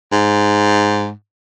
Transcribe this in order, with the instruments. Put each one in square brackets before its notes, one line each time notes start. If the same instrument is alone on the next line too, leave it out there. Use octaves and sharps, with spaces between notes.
[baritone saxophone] G#2